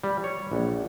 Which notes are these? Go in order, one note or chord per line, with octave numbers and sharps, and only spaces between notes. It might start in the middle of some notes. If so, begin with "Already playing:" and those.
G3
C#5
A#1